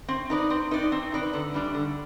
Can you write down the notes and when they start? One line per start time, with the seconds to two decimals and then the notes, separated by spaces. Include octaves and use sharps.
0.08 C4
0.30 D#4 B4 D5
0.50 C4
0.71 D#4 B4 D5
0.92 C4
1.12 D#4 B4 D5
1.33 D3
1.54 G3 D4
1.74 D3